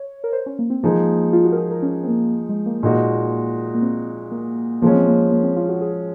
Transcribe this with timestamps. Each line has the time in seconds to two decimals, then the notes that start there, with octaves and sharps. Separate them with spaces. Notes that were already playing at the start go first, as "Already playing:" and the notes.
Already playing: C#5
0.24 A#4
0.33 C5
0.46 C#4
0.59 A#3
0.70 C4
0.83 F3 G#3 A#3 D#4 G#4
1.33 F4
1.45 F#4
1.52 A#4
1.57 G#4
1.71 A#4
1.83 C#4
2.03 C4
2.07 A#3
2.49 G#3
2.66 A#3
2.83 A#2 G#3 D#4 F#4
3.75 A#3
3.82 C4
4.32 A#3
4.82 F3 G#3 A#3 C#4
4.95 C4
5.08 A#3
5.31 A#3
5.44 C4
5.56 F4
5.69 F#4
5.81 G#4